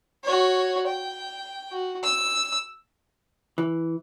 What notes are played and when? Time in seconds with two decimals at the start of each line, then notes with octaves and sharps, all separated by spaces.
0.24 F#4 C#5
0.86 G5
1.71 F#4
2.03 E6
3.58 E3